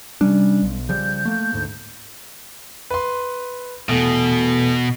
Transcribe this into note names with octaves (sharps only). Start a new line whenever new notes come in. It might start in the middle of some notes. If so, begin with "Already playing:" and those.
C3 G3 C#4 D4
B1
C#3 F3 G3 G6
A3 A#3
D2 G#2
B4 C6
E2 B2 A3